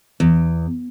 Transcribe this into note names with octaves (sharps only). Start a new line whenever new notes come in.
E2